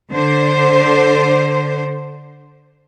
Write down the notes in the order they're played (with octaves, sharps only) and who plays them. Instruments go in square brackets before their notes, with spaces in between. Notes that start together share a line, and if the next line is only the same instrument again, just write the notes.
[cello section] D3 C5